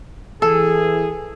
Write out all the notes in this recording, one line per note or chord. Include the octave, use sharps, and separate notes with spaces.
E3 G#4 A4